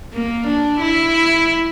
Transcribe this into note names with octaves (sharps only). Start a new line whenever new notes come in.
A#3
D4
E4